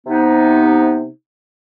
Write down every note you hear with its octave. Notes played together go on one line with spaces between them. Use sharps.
C3 B3 D#4